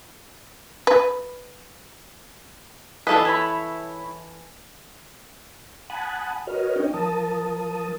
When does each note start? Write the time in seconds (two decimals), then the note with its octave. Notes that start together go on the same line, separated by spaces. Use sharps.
0.87 B4
3.07 E3 D4 F4 A4 B4 D#5
3.25 E4 C#5 B5
5.90 F#5 G#5 A5 B5 D#6 F#6
6.47 F#4 A#4 B4 C#5 D#5 F6
6.76 C#4 D4 C#5 D#5 G5
6.93 F3 A#4 A5 D#6